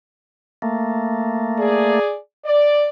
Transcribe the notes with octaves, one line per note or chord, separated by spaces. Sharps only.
A3 A#3
G#4 D5
D5